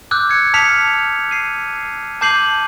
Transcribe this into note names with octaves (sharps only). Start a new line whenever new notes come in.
D6 E6 F#6 G6
G#6 C#7
A5 D#6 F6 B6 C#7 F7
C7 D#7
A5 D6 G6 C7 D#7 F#7